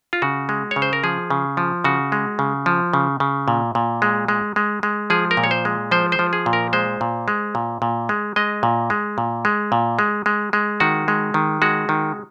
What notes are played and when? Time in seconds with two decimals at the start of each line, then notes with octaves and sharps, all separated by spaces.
0.13 F4
0.22 C#3 F#4
0.49 G#3
0.71 C#5
0.76 C#3
0.82 C5
0.93 A#4
1.03 F3 G#4
1.30 C#3
1.57 F3
1.84 C#3 F#4
2.12 G#3
2.39 C#3
2.66 F3
2.93 C#3
3.20 C#3
3.48 A#2
3.75 A#2
4.02 G#3
4.28 G#3
4.56 G#3
4.83 G#3
5.10 F3 G#4
5.31 A#4
5.37 A#2
5.44 C#5
5.51 C5
5.65 G#3
5.91 F3 C5
6.12 C5
6.19 F3
6.33 G#4
6.46 A#2
6.53 A#4
6.73 G#3 C5
7.01 A#2
7.28 G#3
7.55 A#2
7.82 A#2
8.09 G#3
8.36 G#3 D#5
8.63 A#2
8.90 G#3
9.18 A#2
9.45 G#3
9.72 A#2
9.99 G#3
10.26 G#3
10.53 G#3
10.80 D#3 F#4
11.08 G#3
11.34 D#3
11.62 G#3 F#4
11.89 D#3